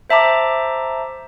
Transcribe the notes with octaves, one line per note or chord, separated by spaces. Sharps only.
C5 E5 A5 A#5 D6